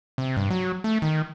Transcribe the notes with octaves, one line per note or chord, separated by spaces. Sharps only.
C3
G2
F#3
A3
D#3